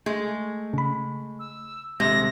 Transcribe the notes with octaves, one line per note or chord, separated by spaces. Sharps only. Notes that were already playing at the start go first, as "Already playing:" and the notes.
G#3 A3
C#3 B5
E6
D#1 G2 C3 G#3 A#6